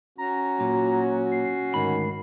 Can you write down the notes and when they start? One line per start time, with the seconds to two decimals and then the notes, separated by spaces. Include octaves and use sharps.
0.18 C#4 F#4 A#5
0.60 A#2 F#3
1.32 C7
1.74 D2 G#2 D#3 B5